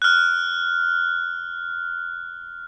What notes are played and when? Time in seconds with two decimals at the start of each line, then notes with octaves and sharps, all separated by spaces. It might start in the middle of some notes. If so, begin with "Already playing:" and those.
0.02 F6 F#6